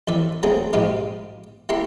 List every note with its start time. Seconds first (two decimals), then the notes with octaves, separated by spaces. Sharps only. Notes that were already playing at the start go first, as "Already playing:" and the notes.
0.08 F2 E3 D5 E5
0.43 F#3 A3 A#3 C4 D4 G#4
0.73 A#1 G#2 B2 G4 F5 D#6
1.69 A#3 E4 G4 A#5 C6